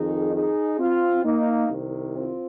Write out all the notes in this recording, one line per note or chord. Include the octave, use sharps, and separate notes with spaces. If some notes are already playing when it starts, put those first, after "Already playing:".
Already playing: F2 D#3 D#4 G#4
D#4 G#4
C4 F4
A#3 D#4
C2 C3 D#3
C4 F4